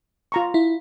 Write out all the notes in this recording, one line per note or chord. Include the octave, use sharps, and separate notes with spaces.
F4 A#5 C#6
E4